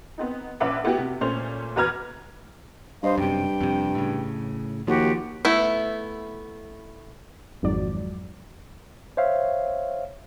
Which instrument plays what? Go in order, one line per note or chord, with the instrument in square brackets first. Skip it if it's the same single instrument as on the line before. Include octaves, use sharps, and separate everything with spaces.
[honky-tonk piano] B3 C4 D#4
A#1 C#4 B4 E5 F#5 D6
A3 B3 E4 F#4 G4
C3
A#2 A3 C#4 C5 F7
E2 F#4 B4 A#5 F6 G#6
[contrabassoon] G2 [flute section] C5 D#5 F5
[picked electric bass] F#2 C3 [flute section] G5
[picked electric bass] F2 C3
A2 C#3
[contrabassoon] D#2 [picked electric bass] F3 [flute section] F#4 G4
[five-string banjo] A3 B3 E4
[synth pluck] G#1 F2 G#2 F#3 D5
[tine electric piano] C5 C#5 E5 F5